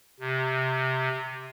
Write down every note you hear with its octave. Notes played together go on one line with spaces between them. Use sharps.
C3